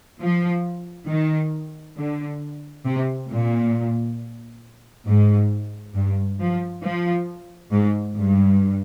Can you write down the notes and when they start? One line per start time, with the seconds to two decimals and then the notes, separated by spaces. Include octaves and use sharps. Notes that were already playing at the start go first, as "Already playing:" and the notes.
0.20 F3
1.08 D#3
1.98 D3
2.86 C3
3.30 A#2
5.06 G#2
5.95 G2
6.40 F3
6.83 F3
7.72 G#2
8.17 G2